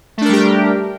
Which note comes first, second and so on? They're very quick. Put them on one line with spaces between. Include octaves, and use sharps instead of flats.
A3 D4 A#4 G3 G4